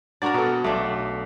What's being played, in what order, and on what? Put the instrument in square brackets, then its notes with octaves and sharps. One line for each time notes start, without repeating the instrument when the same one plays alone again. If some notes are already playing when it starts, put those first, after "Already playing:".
[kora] D4 F#4 A#4 [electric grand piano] A#5 A6
[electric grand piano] B2 A4 [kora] B3
[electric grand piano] B1 [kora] A3 D4